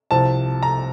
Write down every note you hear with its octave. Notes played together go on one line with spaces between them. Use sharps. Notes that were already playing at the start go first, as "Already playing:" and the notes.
C2 C3 F3 A5
A#5